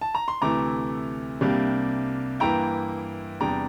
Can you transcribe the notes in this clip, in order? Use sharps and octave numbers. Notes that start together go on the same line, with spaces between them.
A5
A#5
C6
D2 C3 E3 A3 E4 A#5 D6
C2 C3 G3 A#3 D4
G2 E3 A#3 E4 G5 A#5
E2 C3 G3 D4 G5 A#5